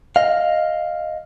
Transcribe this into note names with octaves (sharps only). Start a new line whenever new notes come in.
D#5 F5